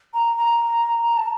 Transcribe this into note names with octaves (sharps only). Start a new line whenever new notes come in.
A#5
A#5
A#5
A5